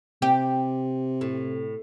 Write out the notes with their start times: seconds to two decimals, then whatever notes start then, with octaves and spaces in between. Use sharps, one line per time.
0.22 C3 G4
1.21 A2